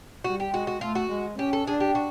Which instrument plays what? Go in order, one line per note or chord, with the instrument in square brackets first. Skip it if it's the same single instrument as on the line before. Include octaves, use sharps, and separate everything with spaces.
[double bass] G3 [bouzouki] F#4
[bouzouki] G4
[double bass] G#3 [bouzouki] F#4
[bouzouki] F#4
[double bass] A3 [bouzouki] F4
[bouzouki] F#4
[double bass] G#3
[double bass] C#4 [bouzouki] G4
[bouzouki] A4
[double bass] D4 [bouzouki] G#4
[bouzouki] G4
F#4